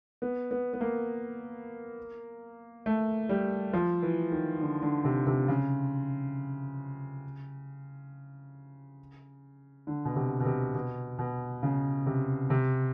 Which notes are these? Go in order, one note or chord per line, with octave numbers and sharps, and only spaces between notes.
B3
B3
B3
A#3
A3
G3
F3
E3
D#3
D3
D3
C3
C3
C#3
D3
B2
C3
B2
C3
B2
B2
C#3
C3
C3